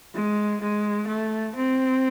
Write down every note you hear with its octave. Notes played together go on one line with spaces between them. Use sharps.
G#3
G#3
A3
C4